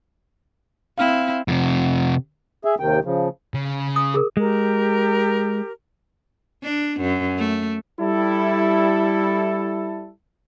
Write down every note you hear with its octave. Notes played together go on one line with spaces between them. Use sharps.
C4 E4 F5 F6
F2 C3
G#4 E5
D#2 C3 D#3 G5
C#3 F3
C#3
D#6
G#4 A#4
G#3 G4 A#4
D4
F#2
A3
G3 E4 A4